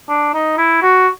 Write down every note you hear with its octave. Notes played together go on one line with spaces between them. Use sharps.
D4
D#4
E4
F#4